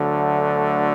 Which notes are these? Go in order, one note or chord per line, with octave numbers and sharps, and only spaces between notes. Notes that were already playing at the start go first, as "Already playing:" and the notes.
Already playing: D2 D3 F#3 A3